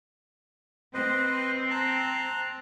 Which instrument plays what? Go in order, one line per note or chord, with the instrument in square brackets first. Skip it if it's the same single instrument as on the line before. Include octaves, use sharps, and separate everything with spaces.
[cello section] C4 [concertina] B4 C5 D#5
[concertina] A5 A#5 F#6